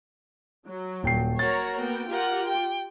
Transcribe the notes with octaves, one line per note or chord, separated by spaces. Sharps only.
F#3
D#1 G5 C7
F#4 A#4 C#5 A#5 A6
A#3 B3 G5
F4 G4 A#4 F#5
G5